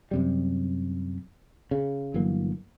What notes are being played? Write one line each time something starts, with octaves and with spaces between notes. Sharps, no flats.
F#2 C3 G3
C#3
G1 E3 F#3 A#3